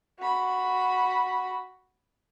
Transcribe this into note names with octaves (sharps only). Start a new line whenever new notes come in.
F#4 B5